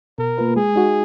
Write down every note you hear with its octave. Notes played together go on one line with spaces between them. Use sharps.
B2 A#4
A#3 F4 B4
G#3 G#4
D#4 F#4